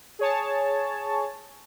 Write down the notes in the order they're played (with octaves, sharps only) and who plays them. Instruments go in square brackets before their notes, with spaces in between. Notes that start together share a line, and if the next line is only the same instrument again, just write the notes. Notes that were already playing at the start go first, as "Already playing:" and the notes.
[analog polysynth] G#4 C#5 A5